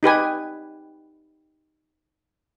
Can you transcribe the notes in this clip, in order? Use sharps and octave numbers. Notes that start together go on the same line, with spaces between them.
D#4 G4 B4 G#5